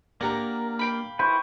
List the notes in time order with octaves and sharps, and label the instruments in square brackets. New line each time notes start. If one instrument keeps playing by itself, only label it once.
[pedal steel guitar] A#3 [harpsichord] D4 G4 [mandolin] A#4 F#5 A#5
[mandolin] F5 G5 B5
[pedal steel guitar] E4 B4 [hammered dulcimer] C5 C#6